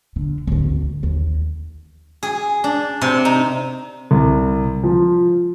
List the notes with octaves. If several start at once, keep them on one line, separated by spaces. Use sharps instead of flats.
D3
G#1 D2
D#2
G#4
D4
C3
D#4
C2
F3